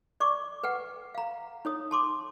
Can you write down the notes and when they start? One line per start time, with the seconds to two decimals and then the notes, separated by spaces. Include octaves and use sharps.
0.20 D5 C#6 D6
0.63 B4 F#5 G5
1.15 F5 A#5
1.65 D#4 C#5 D#6
1.91 A5 C6 D6